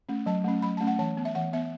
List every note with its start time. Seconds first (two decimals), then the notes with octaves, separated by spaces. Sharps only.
0.09 A3 C#4
0.26 F#3 A5
0.44 A3 C#4
0.62 F#3 B5
0.77 A3 C#4 A5
0.87 F#5
0.99 E3 A5
1.17 B3
1.25 E5
1.35 E3 F#5
1.53 B3 E5